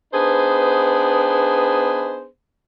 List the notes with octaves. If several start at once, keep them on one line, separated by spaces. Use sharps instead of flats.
B3 D4 D#4 G#4 B4 C5